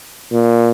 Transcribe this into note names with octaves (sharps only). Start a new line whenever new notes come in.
A#2